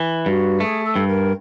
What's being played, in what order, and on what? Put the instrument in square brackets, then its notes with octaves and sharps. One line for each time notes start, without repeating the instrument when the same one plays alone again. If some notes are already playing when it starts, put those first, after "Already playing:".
Already playing: [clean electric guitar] E3
[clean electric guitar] G2 [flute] F#4
[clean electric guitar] A3 [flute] G#4
[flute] A4
[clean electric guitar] G2
[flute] A#4